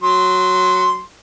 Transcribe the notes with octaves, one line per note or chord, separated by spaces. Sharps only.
F#3 C6